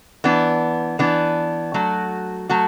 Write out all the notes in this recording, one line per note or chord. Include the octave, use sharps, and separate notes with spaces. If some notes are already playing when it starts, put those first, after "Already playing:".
E3 B3 D4
E3 B3 D4
F#3 A3 F#4
F#3 A3 F#4